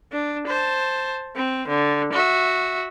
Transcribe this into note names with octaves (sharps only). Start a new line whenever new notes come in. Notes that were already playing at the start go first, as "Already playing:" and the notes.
D4
C5 A5
C4
D3
F#4 E5